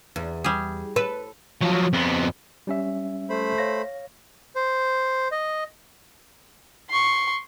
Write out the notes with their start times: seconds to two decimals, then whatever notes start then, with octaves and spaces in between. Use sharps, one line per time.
0.16 E2
0.44 G3 G#4
0.96 A4 B4
1.61 F3 F#3
1.93 F2 B3
2.67 G3 C#4 E5
3.29 A3 C5 B5
3.58 C#5 F5 A#6
4.55 C5
5.31 D#5
6.90 C6 C#6